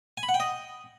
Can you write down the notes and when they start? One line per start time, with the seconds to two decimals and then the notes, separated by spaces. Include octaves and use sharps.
0.17 G#5
0.23 B5
0.29 F#5
0.34 G5
0.40 D#5